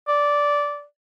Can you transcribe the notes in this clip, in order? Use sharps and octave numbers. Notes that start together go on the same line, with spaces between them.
D5